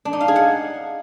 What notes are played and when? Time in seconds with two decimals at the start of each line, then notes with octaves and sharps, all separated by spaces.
0.05 D4
0.13 D#4
0.21 F5
0.28 G#4
0.36 F#5